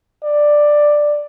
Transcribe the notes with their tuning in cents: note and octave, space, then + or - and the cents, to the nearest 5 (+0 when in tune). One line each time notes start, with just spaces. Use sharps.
D5 +10